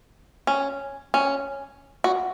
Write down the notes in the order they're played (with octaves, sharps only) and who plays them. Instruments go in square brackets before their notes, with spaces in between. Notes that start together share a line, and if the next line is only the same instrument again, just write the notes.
[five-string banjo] C#4
C#4
F#4